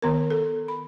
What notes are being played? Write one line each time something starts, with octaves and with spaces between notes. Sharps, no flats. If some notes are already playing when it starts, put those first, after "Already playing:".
D#3 B3 A#4
A4
B5